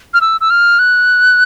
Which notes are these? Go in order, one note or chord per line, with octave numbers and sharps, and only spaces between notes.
F6
E6
E6
F6
F#6